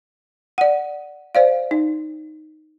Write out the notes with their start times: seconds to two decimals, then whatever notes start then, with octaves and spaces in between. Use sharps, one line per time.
0.58 D5 F#5
1.35 C5 D5 F5
1.71 D#4